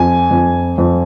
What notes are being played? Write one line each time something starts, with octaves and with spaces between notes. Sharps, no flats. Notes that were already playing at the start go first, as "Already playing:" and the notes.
Already playing: F2 G#5
F2
F2